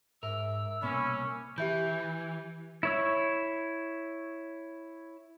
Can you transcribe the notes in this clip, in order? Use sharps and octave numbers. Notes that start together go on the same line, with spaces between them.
G#2 A#4 E5 E6
C2 B2 A#3 C#4 B5
E3 G4 E5 G6
E4 C#5 E6